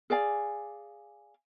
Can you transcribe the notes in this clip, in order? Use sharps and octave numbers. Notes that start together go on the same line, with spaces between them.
G#4 D5 F5 G#5